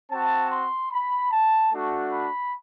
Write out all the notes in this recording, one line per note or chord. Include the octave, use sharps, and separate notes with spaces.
C4 F#4 A5
C6
B5
A5
A3 D4 F#4
B5